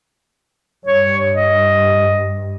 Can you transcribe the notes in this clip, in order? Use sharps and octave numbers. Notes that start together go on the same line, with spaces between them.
G2 C#5
D#5